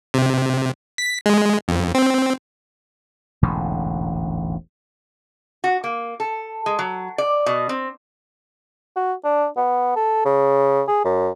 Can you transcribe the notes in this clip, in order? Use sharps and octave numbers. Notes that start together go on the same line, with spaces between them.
C3
B6
G#3
F2
C4
E1 A1 G#2 D3
F#4
A#3
A4
G#3
F#3
D5
B2
C4
F#4
D4
B3
A4
C#3
G#4
F#2